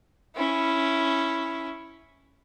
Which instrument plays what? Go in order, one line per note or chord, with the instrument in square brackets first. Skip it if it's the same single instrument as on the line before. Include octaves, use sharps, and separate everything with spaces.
[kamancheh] C#4 E4